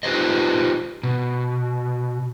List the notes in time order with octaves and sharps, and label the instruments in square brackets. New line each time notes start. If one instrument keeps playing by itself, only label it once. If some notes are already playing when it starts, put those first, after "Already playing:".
[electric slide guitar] D#4 F4 G4 B4 C5 D#5
B2